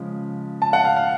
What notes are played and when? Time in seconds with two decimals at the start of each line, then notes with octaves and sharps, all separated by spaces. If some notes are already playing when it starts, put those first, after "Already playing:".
Already playing: C#3 F3 G#3
0.62 A5
0.73 F#5
0.85 F5
0.96 F5